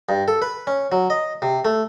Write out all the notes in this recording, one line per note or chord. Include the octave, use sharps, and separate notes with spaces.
G2
A4
B4
C#4
F#3
D#5
C3
A3